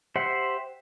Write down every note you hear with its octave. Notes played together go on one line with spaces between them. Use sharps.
G4 C5 E5 F#5